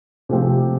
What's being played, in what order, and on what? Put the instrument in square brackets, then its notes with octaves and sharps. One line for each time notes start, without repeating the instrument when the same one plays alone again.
[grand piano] C3 F3 A3 C4 G4